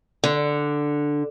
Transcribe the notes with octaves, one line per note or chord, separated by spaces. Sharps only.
D3